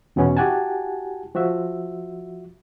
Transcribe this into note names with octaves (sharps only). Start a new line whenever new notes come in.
E2 B2 E3 B3 C#4
E4 F#4 G4 F#5 G#5 A5
F3 F#4 E5